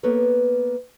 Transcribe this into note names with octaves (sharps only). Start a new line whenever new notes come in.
A#3 B3 A4 B4 C#5